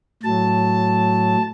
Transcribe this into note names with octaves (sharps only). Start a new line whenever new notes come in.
A2 F#3 A5